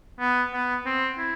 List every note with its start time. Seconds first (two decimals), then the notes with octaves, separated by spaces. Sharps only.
0.20 B3
0.53 B3
0.86 C4
1.18 E4